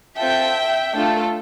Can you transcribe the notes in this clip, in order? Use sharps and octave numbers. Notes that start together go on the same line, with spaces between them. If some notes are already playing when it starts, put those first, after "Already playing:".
C4 F4 A4 E5 G5
A3 D4 F4 A4